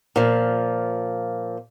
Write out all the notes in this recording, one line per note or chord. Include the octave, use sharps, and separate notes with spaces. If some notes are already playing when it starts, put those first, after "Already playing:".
A#2 F3